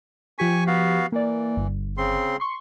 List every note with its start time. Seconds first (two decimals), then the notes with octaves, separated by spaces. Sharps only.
0.39 F3 G4 G#5 C#6 B6
0.67 B3 F#4 F5
1.12 E3 A#3 D5
1.57 G1
1.97 C#3 C4 C6
2.40 C6 C#6